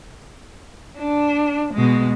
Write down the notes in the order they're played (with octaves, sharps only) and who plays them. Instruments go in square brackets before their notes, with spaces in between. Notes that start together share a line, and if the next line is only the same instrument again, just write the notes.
[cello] D4
B2 G#3